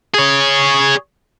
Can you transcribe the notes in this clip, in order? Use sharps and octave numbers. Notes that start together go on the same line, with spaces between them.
G#4 C#5